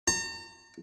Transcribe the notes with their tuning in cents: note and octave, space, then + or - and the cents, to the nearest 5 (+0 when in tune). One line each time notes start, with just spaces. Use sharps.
A#5 -40